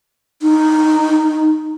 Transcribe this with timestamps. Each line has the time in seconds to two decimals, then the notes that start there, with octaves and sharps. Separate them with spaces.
0.42 D#4